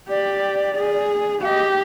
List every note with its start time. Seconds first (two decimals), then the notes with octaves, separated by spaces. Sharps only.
0.09 G4 D5
0.75 G#4
1.42 G4 F5
1.46 D#5